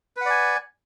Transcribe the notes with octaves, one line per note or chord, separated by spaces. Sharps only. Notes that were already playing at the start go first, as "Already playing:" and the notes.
B4 D5 F#5 G#5